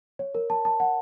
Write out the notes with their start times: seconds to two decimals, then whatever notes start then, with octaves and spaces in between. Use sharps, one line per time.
0.19 C#5
0.35 A#4
0.50 A5
0.65 A5
0.80 F#5